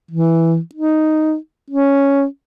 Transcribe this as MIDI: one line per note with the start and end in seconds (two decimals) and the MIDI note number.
0.11 0.58 52
0.75 1.35 63
1.70 2.24 61